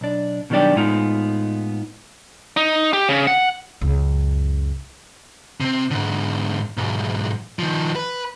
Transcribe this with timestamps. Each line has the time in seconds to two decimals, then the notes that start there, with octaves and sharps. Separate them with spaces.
0.01 B1 D4
0.50 B2 D#3 F#3 G3 D4 G4
0.75 A2 G#3 B3 D#4 F4
2.57 D#4
2.93 G4
3.09 C#3
3.27 F#5
3.81 C#2 F#2
5.61 C3 C4
5.91 G#2 D3
6.77 B1 G#2
7.59 D#3 F3
7.96 B4